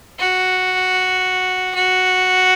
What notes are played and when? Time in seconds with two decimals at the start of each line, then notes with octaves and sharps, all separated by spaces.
0.19 F#4
1.75 F#4